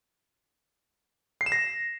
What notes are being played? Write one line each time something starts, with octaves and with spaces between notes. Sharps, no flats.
C7
E7
A#6